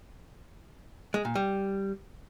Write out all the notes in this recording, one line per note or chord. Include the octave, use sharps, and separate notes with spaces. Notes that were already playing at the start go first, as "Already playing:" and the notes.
G#3
A#2
G3